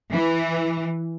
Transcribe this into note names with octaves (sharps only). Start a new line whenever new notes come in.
E3